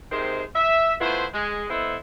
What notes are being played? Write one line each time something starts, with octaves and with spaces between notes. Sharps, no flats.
C3 D#3 G#3 C5
E5
A3 B3 E4 F4 C5
G#3
B3 E4 A4 C5 D#5 F#5